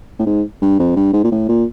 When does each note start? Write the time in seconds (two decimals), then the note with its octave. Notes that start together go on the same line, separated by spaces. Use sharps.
0.19 A2
0.26 G#2
0.62 G2
0.79 F2
0.96 G2
1.13 G#2
1.24 A#2
1.32 A2
1.49 A#2